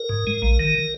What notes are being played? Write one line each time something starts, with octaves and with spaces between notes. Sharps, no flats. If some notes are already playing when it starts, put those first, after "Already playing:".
Already playing: A#4
G#2
G#3
A#1
D#3